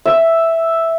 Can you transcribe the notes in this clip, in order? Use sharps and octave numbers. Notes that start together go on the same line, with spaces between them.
E5